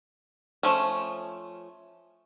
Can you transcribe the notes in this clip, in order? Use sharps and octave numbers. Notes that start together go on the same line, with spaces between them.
F3 A3 C#4